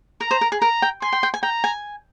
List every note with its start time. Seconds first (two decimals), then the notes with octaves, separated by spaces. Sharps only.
0.21 A#4 A#5
0.31 C5
0.41 A#4
0.52 G#4
0.61 A#4 A#5
0.82 G5
1.02 G#5 C6
1.12 G5
1.23 G5
1.34 G#5
1.43 G5 A#5
1.64 G#5